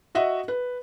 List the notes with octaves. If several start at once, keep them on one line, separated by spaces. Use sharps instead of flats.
F#4 D#5 E5 F#5
B4